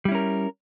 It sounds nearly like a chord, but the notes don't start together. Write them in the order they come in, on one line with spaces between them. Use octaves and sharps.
G3 E4 C#4 A#4